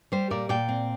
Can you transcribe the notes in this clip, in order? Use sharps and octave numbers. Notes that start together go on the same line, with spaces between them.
G3 G4 C5
A#2 A#4 D5
A#2 D5 G5
C4